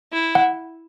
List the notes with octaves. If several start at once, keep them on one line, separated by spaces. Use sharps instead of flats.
E4
F#5